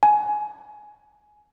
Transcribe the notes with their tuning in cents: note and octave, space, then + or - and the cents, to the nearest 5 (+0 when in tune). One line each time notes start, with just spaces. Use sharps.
G#5 +15